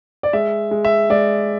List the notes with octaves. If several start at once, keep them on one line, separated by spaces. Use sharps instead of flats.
D5
G#3 E5
G#3
E5
G#3 D5